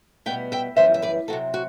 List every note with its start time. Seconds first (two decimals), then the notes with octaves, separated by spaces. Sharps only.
0.26 B2 G3 B3 E5 G5
0.52 E5 G5
0.77 F#2 E3 G3 B3 C5 E5
0.94 E5
1.02 B4 D5
1.28 C3 F#3 C4 F#4 A4
1.54 F#4